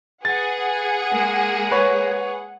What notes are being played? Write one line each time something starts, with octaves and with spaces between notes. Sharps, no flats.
G#4 B4 F#5 A6
G#3 A#3
B4 C#5